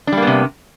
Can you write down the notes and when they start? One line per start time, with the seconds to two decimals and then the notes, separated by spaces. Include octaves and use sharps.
0.07 D4
0.12 G3
0.17 A#3
0.22 B3
0.27 C3